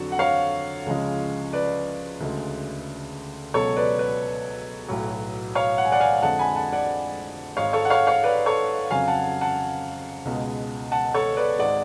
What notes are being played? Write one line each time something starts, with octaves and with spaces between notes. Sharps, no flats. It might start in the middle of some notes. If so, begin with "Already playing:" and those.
Already playing: F2 D3 F#3 F#4 A4
F#5
C#5 F5
C#2 C#3 F3 G#3
B4 D5
D2 C#3 G#3
C#2 B2 F#3 A4 C#5
B4 D5
B4 D5
B1 A2 F#3
C#5 F5
F#5
G#5
D5 F#5
F5 G#5
F2 D3 G#3 F#5 A5
G#5 B5
F#5 A5
D5 F#5
G#1 G#2 G#3 C#5 F5
A4 C#5
F#5
C#5 F5
C#5 F5
B4 D5
A4 C#5
F2 C#3 F#3 F5 G#5
F#5 A5
F#5 A5
C#2 B2 G#3
F#5 A5
A4 C#5
B4 D5
G#1 G#2 G#3 D5 F#5